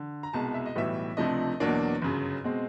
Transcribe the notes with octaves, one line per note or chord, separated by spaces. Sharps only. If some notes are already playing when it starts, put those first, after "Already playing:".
Already playing: D3
A#5
C2 B2 G#3 A5
E5
D#5
B1 A2 E3 G3 B3 E5
C#2 C3 F3 A3 D4 D#5
E2 B2 F#3 A#3 D4
G1 F#2 C#3
B2 G#3 C4